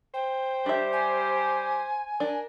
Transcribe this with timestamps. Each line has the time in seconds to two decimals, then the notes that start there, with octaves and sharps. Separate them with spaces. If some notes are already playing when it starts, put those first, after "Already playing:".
0.14 C5 G5
0.66 G3 D4 G4 E5
0.92 G#5
2.20 D4 A#4